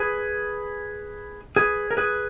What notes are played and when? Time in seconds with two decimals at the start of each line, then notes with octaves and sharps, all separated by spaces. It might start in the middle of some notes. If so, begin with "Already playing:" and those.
Already playing: G#4 B4
1.56 G#4 B4
1.91 A#4
1.97 G#4 B4